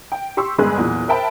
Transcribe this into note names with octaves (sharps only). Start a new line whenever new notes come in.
G5
G4 C6 C#6 E6
G1 G#3 G#4 F#6
B1 E2 A#2
A#4 C5 E5 G5 A5 B5